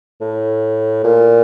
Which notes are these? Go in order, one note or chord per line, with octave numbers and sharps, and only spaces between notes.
A2
A#2